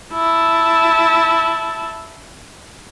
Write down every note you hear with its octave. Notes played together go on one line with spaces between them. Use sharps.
E4 A5